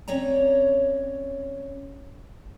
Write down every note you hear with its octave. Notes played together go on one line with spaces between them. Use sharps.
C4 C#4 C#5 D5 A#5